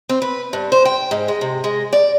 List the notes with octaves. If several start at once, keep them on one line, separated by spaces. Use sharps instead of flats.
C4
B4
G2
C5
G5
G#2
G#3
C3
G#3
D5